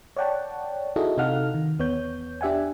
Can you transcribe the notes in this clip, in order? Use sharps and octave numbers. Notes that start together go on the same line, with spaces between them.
C#5 D5 F#5 G5 A5
D#4 E4 F#4 G#4 A4 D#5
C3 D#4 A4 F5 F#5 F6
D#3
E2 B3 C#5 G6
D4 G4 E5 F#5 G#5